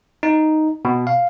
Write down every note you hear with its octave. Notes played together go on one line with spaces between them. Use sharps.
D#4
B2
F5